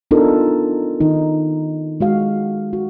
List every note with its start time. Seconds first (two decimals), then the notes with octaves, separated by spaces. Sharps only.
0.11 B3 D4 D#4 F4 A4 A#4
1.01 D#3 D#4
2.00 G#3 F#4 F5
2.73 F#4